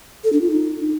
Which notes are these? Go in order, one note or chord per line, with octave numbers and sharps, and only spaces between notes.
A4
D4
F4
D#4